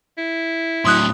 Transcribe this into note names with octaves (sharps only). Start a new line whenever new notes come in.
E4
A2 F#3 C6 D#6 F#6